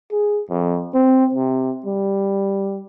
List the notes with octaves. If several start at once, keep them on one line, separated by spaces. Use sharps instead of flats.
G#4
F2
C4
C3
G3